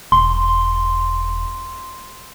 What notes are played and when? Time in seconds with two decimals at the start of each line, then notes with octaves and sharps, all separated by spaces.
0.12 E1 C6